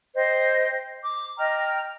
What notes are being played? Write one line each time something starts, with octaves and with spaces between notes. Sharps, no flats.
C5 D#5 G5
D6
D#5 G5 A#5 F6